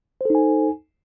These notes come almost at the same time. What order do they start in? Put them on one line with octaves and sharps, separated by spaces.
C5 A4 D#4 G#5